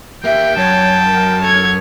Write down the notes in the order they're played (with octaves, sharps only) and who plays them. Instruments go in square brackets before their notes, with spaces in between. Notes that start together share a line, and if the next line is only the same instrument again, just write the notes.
[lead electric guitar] A#3 G4 [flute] E5 [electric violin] G5
[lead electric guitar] F#2 [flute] C#5 [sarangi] A5
[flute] A#4
[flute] A4 [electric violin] C#5 G#6